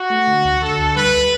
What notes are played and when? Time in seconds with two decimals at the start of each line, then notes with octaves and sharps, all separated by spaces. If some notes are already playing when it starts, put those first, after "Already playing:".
Already playing: F#4
0.10 A3
0.27 D3
0.45 D2
0.61 D3 A4
0.78 D2
0.95 G3 B4